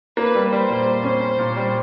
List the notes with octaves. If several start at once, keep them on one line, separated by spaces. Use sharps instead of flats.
A#3 B4
G3
G3 C5
A#2
A#3
C#4
C#4
A#2
G3